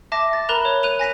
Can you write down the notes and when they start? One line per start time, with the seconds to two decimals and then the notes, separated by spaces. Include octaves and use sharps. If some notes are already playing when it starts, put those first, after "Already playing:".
0.12 E5 A5 D6 A#6
0.33 A6
0.49 A#4 A#5 B5 F#6 E7 F7
0.65 C#5
0.83 F#6 D#7 F7
0.99 G#5 A#6 B6 D#7